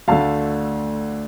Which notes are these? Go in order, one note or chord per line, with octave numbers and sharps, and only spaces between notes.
D2 D3 A3 F5 A5